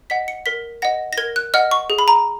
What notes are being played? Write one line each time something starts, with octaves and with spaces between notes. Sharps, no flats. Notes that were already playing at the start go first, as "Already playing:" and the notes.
D#5 F#5 B6
C#7
A#4 B6
D#5 F#5 A#6
A#6
A#4 G#6
F#6
D#5 F#5 F6
C#6
G#4
B5
A#5